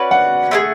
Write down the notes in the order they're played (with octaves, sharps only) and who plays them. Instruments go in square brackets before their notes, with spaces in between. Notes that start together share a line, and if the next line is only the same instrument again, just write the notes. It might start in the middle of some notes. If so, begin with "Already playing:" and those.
Already playing: [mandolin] C#4 F#4 B4 D5
[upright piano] F#5
[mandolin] A3 D4 G#4